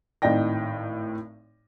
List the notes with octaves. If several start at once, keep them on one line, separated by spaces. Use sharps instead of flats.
G#1 A2 D#4 D5 G5 A#6